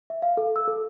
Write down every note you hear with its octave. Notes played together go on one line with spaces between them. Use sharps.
E5
F5
A4
E6
A4